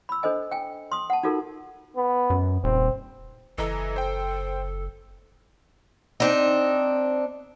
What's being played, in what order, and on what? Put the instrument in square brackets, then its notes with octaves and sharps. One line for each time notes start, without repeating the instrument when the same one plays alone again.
[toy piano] B5 E6
D4 A4 C5 D#5 G#5
G5 G#5
C6 D#6
F#5 A5
D#4 F4 F#4 A4 A#4
[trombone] B3
[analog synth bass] F#2
[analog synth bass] D#1 [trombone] C4
[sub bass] F#1 [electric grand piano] E3 D#5 A#5 [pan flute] A4
[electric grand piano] C5 G5
[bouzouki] C4 D4 D#4